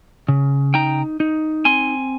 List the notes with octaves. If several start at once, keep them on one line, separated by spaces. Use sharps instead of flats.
C#3
D#4 G5 A#5
D#4
C4 G#5 C6